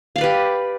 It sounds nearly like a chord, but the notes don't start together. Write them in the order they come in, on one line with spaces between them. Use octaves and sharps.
F5 D5 B4 G4